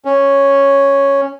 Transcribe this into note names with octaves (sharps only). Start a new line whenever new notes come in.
C#4